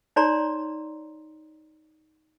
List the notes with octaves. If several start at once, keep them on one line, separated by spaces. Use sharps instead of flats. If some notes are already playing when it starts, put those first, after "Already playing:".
D#4 C#5 D5 A#5 C6